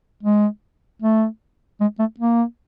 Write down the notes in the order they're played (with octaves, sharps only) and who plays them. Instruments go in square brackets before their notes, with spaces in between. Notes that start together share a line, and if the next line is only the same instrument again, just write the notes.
[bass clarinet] G#3
A3
G#3
A3
A#3